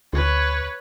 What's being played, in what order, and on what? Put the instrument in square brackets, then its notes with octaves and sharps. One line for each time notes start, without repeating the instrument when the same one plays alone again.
[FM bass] D2 [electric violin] B4 C#5